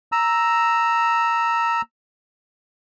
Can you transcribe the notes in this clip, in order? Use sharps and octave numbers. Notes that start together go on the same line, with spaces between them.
A#5 E6